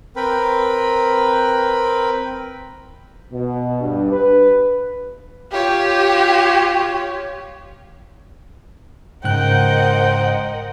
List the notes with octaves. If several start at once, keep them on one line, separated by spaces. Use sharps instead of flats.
C4 A#4 B4 G5 B5
B2
G2
B4
F4 G4 C#5
G#2 C#3 A#4 C5 D#5 F#5 G5 F#6